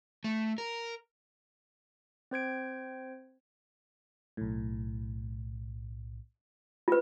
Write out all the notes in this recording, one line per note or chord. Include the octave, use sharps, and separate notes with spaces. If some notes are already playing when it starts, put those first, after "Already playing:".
A3
A#4
C4 C5 G#6 D7
B1 A2
F4 B4